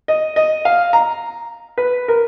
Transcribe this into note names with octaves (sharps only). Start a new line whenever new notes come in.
D#5
D#5
F5
A#5
B4
A#4